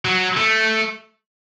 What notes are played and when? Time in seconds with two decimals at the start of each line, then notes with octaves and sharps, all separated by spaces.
0.05 F#3
0.37 A3